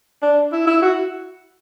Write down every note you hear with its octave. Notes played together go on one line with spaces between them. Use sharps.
D4
E4
E4
F#4